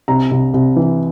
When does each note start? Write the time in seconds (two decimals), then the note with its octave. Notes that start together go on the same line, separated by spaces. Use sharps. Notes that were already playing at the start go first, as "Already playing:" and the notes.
0.08 C2 A#5
0.31 C2
0.54 C2
0.76 E3